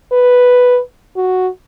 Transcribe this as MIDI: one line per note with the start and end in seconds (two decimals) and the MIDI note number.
0.12 0.79 71
1.16 1.48 66